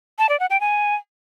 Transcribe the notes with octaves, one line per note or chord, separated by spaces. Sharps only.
A5
D5
F#5
G5
G#5